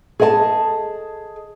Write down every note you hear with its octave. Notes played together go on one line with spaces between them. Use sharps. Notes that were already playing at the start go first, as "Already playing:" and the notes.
G#4 A4 D#5 G5 A5